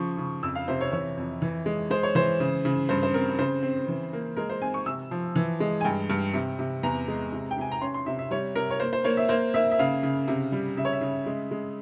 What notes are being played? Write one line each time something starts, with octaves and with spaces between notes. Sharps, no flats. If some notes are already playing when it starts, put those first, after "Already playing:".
Already playing: C#3 F3 C#6
C#3
F2 E6
F5
C3 C5
C#5
E3 C#5
F2
E3
G#3
G#3 C5
C#5
E3 C5
C#3
C#3
G2 C5
C5
C4 A#4
C#3 C5
C4
E3
A#3
G#3 A#4
C5
C4 G#5
C#6
C3 E6
F3
E3
G#3
G#5
G2 G5
G2
C3
C3
E2 A#5
G#3
C3
G5
C3 G#5
A#5
C#4 C6
C6
C3 E5
E5
G3 C#5
C3 A#4
C#5
A#3 C5
C5
A#3 C#5
E5
A#3 C5
A#3 E5
E5
C#3 F5
C#3
C3
G3
C#3 E5
C#5
E5
C#3
G#3
G#3